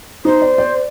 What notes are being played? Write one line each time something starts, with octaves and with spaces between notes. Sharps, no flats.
D#4 C5
D5
D5